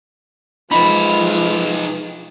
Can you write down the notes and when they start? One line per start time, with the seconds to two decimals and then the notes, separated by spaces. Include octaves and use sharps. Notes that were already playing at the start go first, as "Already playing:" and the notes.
0.71 F3 G#3 D#4 B4 B5